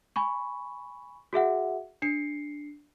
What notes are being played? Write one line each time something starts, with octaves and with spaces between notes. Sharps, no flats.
G#5 B5 C#6
F#4 G#4 E5 F#5
D4 C7 C#7